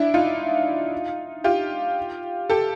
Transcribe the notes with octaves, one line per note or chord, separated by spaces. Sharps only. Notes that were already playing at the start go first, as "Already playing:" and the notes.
Already playing: D4 E4
D#4 F4
F4 G4
G4 A4